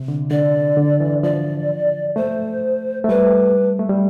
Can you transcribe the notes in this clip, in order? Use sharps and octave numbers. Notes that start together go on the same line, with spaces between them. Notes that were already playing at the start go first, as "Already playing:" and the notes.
Already playing: C3
D3
D3 D5
D3
E3
F3 D5
A3 C5
A3
G3 B4
A3
G3